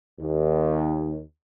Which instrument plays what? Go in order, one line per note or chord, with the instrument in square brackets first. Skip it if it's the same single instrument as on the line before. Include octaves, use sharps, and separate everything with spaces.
[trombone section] D#2